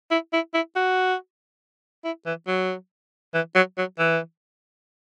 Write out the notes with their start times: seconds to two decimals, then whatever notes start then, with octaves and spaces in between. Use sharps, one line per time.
0.11 E4
0.33 E4
0.54 E4
0.75 F#4
2.04 E4
2.26 E3
2.47 F#3
3.34 E3
3.55 F#3
3.78 F#3
3.99 E3